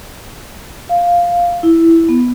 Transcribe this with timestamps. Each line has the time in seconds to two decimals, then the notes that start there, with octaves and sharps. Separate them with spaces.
0.89 F5
1.63 E4
2.09 B3